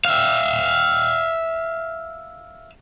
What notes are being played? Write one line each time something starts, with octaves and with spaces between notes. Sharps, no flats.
E5 F5